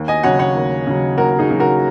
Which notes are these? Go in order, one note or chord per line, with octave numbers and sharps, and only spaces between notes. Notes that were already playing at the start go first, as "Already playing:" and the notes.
Already playing: D#2
D#5 G#5
C#3 F#3 C#5 F#5
C#5 F#5
D#2
C#3 F#3
D#2 F#4 A#4
D#4 G#4
C#3 F#3
F#4 A#4